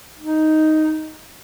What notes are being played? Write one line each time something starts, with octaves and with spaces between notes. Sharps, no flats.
D#4